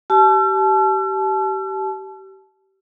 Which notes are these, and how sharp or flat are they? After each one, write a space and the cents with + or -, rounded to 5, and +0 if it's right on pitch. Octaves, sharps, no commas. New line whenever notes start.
G4 -30 A5 -30 E6 +45